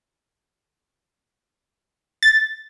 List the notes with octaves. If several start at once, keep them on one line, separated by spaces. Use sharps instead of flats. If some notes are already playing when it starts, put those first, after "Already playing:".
A6